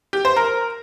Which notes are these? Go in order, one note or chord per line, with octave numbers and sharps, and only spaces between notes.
G4
C5
A#4